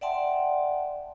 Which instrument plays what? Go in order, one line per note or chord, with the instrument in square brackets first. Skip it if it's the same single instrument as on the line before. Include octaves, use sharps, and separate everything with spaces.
[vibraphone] D5 E5 F#5 G5 A5 C6